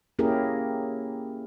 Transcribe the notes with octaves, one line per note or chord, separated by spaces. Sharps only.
A#3 C#4 E4 G4 G#4 A#4